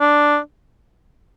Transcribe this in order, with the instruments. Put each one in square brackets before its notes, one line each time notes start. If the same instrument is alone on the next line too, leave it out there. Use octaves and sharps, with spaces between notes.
[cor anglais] D4